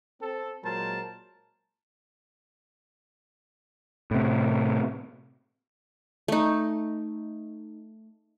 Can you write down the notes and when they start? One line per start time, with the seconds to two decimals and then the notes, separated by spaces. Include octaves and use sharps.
0.21 C4 A4
0.64 A#2 F#3 G#3 A#4 C5 A5
4.11 A2 C3
6.28 A3 D#4